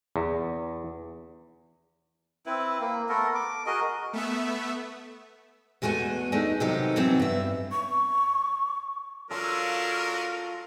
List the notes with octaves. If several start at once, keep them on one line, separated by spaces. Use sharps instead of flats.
E2
C4 E4 B4
A#3
A3 B3 A4 A#4
D6
F#4 G#4 A#4 D#5
A3 B3 E5
E2 G#3 A3 F#4 G#5
G#3 A3 D4 D#4
C3 D#3 F#3 D#4 G4 A4
E3 F#3 B3 C4
G2 E5
C#6
F#3 C#4 D4 F4 A4 A#4 F5